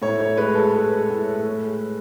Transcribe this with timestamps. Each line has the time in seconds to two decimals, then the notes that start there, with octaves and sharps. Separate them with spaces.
0.02 A2 C#5
0.20 C#5
0.37 G#3 B4
0.55 A4
0.74 G#3 B4
1.10 A2
1.46 G#3